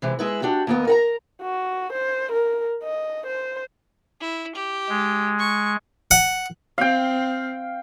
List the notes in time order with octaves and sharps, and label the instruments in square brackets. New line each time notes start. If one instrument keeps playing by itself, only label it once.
[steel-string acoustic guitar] C3 E3 G#3
G#3 E4 B4
D4 F#4 G4
D#2 A#3 B3
A#4 F#5 A#5
[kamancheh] F#4
C5
A#4
D#5
C5
[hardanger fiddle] E4
G4
[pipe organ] G#3
[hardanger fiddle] C#6
[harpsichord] F#5
[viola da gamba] C4 [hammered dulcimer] F5 G5